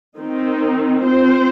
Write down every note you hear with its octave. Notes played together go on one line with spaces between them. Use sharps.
D#3 C4 D#4
C4 F4 C5